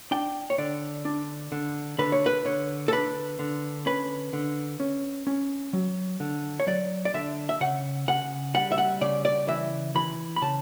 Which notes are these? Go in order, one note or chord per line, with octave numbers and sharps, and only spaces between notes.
D4 G5
C#5
D3 D5
D4
D3
D3 B4
C#5
B4
D3 C#5
A4
D4 B4
D3
C#4 B4
D3
C#4
C#4
F#3
D3
C#5
F#3 D5
D5
D3 E5
E5
C#3 F#5
C#3 F#5
G3 F#5
E5
F#5
C#3 D5
D5
E3 E5
E3 B5
B5
C#3 A5